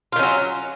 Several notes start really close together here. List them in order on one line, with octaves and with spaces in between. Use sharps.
F4 D#3 C#4 F#3